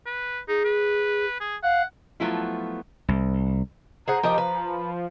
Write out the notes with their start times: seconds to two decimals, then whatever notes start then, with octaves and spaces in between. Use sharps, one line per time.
0.06 B4
0.48 D#4 G#4
0.64 B4
1.40 G#4
1.63 F5 F#5
2.20 F3 F#3 A3 B3 E4 F4
3.08 C2
4.08 G#4 C5 F#5 A#5
4.23 F3 G4 A#4 D#5
4.38 B4